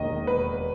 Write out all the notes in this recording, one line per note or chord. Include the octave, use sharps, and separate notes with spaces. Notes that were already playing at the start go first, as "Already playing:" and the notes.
Already playing: E1 D#2 D#3 D#5
B4